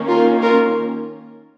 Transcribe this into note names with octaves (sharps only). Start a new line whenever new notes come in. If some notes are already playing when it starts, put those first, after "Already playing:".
Already playing: D#3 A#3 C#4
F4 A#4
F4 A#4